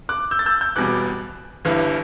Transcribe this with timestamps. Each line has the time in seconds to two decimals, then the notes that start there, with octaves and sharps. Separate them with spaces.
0.09 D6 F#6
0.31 E6 G6
0.39 A6
0.46 E6 G6
0.61 E6 G6
0.76 E1 E2 B2 G3 D6 F#6
1.65 G1 G2 E3